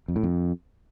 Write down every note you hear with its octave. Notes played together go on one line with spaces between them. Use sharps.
F2
A2
F2